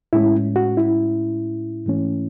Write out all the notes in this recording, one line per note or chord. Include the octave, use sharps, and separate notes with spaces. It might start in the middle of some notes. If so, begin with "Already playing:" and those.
A2 G#3 C#4 E4
F#4
E4
G#2 E3 A3 C#4